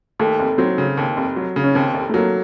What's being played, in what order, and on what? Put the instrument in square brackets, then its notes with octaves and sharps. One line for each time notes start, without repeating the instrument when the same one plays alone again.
[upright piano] D#2 [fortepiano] A3
[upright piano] F1
[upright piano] F#3 [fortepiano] C4
[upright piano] C#3
D#2
F1
F#3
C#3
[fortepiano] C#4
[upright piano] D#2 [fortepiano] C4
[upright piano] F1
[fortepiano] A3
[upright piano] F#3 [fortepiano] A#3